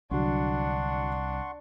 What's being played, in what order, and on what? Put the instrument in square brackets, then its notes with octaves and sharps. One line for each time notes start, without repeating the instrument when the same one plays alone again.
[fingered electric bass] C2 [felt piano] D3 F#3 [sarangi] D4 [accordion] F#5 C6 C#6